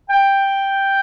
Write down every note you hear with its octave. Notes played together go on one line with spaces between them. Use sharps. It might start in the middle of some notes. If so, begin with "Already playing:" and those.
G5